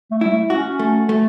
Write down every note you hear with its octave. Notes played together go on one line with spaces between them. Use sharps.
A3
G3 E4
A3
C#4 F#4
A3
A3